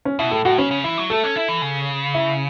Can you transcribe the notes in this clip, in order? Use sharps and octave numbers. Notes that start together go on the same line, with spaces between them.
C#4
B2 E4
A2 A4
A2 F#4
C#3 C#4
C#3
E3 E4
F#3
A3 A4
C#4
E4
E3
C#3
E4